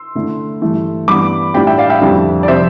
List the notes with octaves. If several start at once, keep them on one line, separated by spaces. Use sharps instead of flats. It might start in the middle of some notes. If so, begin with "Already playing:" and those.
Already playing: C6 E6
D3 A3 E4
G2 E3 A3
G2 E3 B3 D4 B5 D6
A2 G3 D4 F4 G5 B5
E5 G5
D5 F5
E5 G5
F2 D3 G3 C4 E4
D5
C3 F3 C5 E5